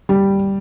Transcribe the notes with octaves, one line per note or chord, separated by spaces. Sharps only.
G3